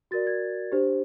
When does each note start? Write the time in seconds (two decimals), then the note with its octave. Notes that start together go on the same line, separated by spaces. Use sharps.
0.11 F#4 A#4 D5 A6
0.27 G#6
0.72 D4 G4 C5